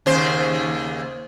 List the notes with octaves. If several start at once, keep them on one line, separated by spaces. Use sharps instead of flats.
D#2 C#3 C5